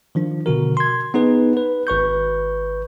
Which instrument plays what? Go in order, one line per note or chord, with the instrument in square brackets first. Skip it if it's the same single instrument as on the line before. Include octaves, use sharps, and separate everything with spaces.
[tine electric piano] D#3 F3 D4
B2 D3 F#4 A#4
C6 G#6
B3 D#4 G#4 B4
B4
G#1 B4 C#6 G6